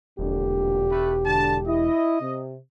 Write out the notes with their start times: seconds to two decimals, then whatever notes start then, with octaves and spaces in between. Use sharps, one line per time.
0.19 E1 F2 A#2 D3 G4
0.91 A3 B4
1.26 D3 A5
1.67 E4 D#5
2.21 C3